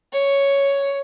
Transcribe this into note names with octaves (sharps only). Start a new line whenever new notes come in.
C#5